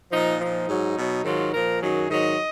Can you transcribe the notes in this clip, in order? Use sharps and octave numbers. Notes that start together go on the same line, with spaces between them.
A#2 F3 D#4
A#2 F3 D#4
G#2 F#3
B2 F#3
G#2 D#3 F#3 F4
A#2 F3 A#4
F#2 D#3 F#3 G#4
G#2 D#3 F#3 D#5